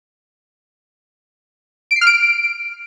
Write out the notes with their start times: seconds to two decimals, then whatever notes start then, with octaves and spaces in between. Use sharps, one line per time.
1.91 D7
1.96 C7
2.01 F6
2.07 D7